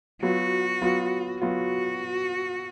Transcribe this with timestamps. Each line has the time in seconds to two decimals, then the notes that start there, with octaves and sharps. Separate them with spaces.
0.22 F#3 B3 F4 F#4
0.82 F#3 B3 F4
1.42 F#3 B3 F4 F#4